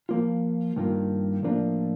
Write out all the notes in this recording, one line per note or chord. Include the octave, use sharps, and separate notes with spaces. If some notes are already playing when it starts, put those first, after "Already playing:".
F3 A#3 F4
G2 D#3 A#3 F4
A2 F3 A#3 D4 F4